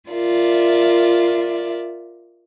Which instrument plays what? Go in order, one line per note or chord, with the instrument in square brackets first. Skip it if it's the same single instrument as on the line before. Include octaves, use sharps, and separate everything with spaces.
[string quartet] F4 A#4 D5 E5